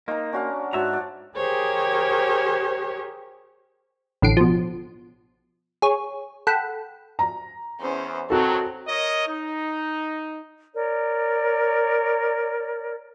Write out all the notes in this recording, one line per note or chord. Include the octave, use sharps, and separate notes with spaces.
A#3 D#4 C5 A#5
C#4 D4 F#4 F5
G#2 F#4 C5 C#5 E5 A5 A#5
D5
G4 G#4 A#4 C5 C#5
A1 D3 C7 D7
B2 F3
G#4 C#5
A4 F#5 G5 B5
A#5
E2 C#4 C5
D#3 F#3 C4 F#4 A4
A#4 C#5 D#5
D#4
A#4 C#5 D5